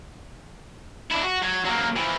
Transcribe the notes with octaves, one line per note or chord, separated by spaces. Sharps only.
D4 E4
F#4
F#3
F#3 A#3
E3 F3